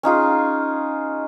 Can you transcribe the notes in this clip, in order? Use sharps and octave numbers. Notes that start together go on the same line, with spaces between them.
C#4 D#4 F4 G#4